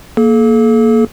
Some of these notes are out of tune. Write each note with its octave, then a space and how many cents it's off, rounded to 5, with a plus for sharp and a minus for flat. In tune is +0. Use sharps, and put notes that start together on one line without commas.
A#3 +0 A4 -40